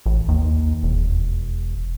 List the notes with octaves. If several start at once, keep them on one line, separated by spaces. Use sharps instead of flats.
A1
D#2
E1